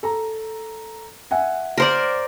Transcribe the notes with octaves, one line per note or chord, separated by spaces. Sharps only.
A4 A#5
E5 F#5 G#5
A#4 C5 D5